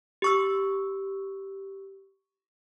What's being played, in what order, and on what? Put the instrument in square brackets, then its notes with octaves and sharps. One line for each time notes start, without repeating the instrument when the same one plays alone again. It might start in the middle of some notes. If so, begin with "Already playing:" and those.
[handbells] G4 C#6 E6